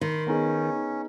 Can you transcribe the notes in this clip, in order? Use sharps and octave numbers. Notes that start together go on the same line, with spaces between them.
D#3 B5 C6
B3 C#4 D#4 G#4